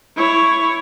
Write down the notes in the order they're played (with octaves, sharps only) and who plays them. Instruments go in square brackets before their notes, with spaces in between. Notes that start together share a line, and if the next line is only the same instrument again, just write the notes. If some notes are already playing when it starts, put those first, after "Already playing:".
[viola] E4 C#5